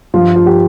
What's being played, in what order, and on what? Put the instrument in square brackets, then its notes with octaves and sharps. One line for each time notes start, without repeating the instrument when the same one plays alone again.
[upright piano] G2 F3 F4
F4
G4